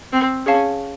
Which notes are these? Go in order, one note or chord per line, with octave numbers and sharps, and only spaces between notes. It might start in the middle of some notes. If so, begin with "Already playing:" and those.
C4
C#4 G#4 C#5 F5 A5